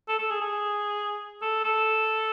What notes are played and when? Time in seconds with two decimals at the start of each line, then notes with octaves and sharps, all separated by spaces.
0.09 A4
0.19 A4
0.31 G#4
0.41 G#4
1.42 A4
1.64 A4